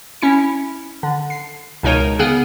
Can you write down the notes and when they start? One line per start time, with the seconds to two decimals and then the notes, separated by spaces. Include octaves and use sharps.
0.22 C#4 E4 C#7
1.03 D3
1.30 C7
1.83 C#2 B2 D#4 A#4 C#5 D#7
2.19 C#3 B3 G#4 F#5 G5 F6